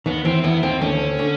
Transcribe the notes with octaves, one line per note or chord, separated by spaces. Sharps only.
D#2 D#3 B3
E2 E3 C4
E2 E3 B3
D#2 D#3 C4
D2 D3 C#4
D3